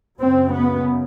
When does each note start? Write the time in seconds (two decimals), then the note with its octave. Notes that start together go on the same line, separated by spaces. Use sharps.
0.19 F#2 C#3 C4
0.50 B3